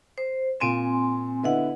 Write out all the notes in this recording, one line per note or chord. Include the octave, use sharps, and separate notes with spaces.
C5
A#2 C4 G#5 C6 D7 E7
D3 B3 E4 B4 D#5 F#5